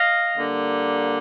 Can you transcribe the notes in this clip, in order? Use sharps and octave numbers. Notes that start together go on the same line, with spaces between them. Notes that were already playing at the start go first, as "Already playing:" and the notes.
Already playing: D#5 F5
D3 G3 A#3